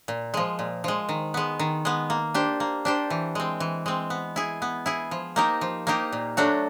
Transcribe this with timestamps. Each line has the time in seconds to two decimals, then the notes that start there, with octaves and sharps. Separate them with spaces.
0.08 A#2
0.34 F3 G#3
0.59 A#2
0.84 F3 G#3
1.09 D#3
1.34 G#3 B3
1.59 D#3
1.85 G#3 B3
2.10 A#3
2.34 D4 G4 C5
2.60 A#3
2.85 D4 G4 C5
3.10 E3
3.35 G#3 C4
3.60 E3
3.86 G#3 C4
4.10 B3
4.36 E4 G#4
4.62 B3
4.86 E4 G#4
5.11 F3
5.36 A#3 D#4 G4 A#4
5.61 F3
5.87 A#3 D#4 G4 A#4
6.12 A#2
6.37 F#3 A3 D4 F#4